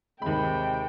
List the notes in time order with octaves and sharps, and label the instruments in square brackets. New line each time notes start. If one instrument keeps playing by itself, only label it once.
[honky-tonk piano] D#2 B5 [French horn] C3 [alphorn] G#3 [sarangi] G5